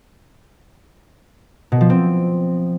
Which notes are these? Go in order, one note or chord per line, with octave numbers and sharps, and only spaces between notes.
B2
F3
C4